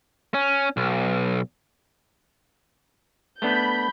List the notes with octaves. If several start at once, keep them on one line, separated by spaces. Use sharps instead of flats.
C#4
B1
A3 B3 D4 B5 G6